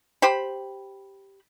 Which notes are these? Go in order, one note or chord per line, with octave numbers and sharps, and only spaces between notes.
G4 C5 B5